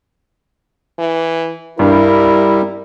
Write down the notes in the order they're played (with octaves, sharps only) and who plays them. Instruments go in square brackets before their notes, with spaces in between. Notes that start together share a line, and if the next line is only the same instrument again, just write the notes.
[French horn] E3
[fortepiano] G2 [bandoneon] G3 [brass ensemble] E4 [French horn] A#4